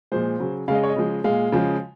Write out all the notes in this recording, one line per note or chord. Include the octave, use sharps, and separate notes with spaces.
A#2 F3 G#3 C5
C#3 F#3
C#3 G#3 D#5 F5
C#5
D#5
C#3 F3 G#3
A#2 G#3 F5
C#3 F3 G#3